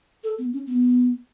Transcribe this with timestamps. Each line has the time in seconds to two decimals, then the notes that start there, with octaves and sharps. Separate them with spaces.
0.23 A4
0.38 B3
0.53 C#4
0.67 B3